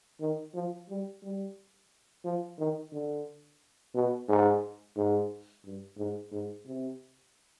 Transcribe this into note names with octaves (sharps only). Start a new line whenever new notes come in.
D#3
F3
G3
G3
F3
D#3
D3
B2
G#2
G#2
G2
G#2
G#2
C3